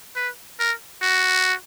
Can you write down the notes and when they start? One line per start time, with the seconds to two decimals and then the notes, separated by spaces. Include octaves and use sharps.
0.16 B4
0.60 A#4
1.02 F#4